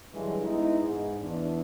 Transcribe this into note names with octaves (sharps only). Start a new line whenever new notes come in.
G2 D3 E3 F#3 G#3
G#3 B3 D#4 E4
G#2
E2 D4